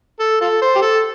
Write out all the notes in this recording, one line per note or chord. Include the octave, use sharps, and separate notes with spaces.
A4
F4 A4
C5
G4
A4